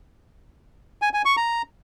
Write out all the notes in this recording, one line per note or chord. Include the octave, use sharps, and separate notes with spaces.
G#5
G#5
C#6
A#5